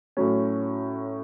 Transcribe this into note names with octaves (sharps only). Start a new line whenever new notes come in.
A2 F#3 C#4